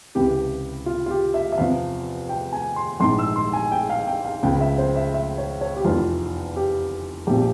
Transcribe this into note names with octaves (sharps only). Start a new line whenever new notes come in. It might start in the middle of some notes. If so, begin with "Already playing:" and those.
C#2 C3 E3 G4
F4
F4
G4
E5
E5
E2 C3 F3 F5
G5
G#5
C6
A#1 G#2 E3 C6
E6
C6
G#5
G5
F5
G5
F5
C#2 C#3 F3 G5
E5
C5
E5
E5
C#5
C#5
G4
F1 E2 E3 F4
G4
A#1 A#2 F3 G4